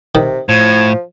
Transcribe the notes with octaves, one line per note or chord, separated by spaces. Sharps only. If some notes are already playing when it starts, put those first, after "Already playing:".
C3 D#3
A2 F3 G#6